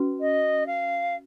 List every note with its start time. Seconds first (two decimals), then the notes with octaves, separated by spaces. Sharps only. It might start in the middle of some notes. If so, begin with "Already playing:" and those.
Already playing: C#4 F#4 B4
0.21 D#5
0.67 F5